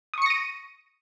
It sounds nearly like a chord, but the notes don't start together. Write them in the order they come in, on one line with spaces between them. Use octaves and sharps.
D#6 C#6 C#7 A#6 D#7